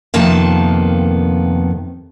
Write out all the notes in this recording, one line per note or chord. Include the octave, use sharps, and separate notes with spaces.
F2 C3 D#3 A#3 B3 A5